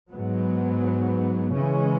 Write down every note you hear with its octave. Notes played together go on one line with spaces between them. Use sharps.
G#2 F#3 B3
C#3 E3 G#3 C#4